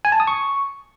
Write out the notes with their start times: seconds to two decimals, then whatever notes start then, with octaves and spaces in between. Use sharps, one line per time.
0.05 G#5
0.12 A5
0.20 D#6
0.27 C#6